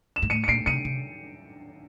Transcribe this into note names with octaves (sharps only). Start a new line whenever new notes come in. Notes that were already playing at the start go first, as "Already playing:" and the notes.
E7
G#2
A2 C#7 D#7
C#7
A#2 C7 D7
C3 C#7 D#7
C3